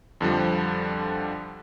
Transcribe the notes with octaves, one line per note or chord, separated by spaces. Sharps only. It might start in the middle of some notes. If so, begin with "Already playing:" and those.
F2 D3 F3 G3